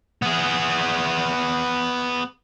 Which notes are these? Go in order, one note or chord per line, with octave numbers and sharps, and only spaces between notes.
B3 G#4